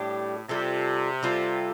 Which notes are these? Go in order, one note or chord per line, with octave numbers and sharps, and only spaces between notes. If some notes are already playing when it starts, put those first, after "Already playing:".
Already playing: A2 G3 D4 G4
C3 G3 F4 A4
G3 F4 A4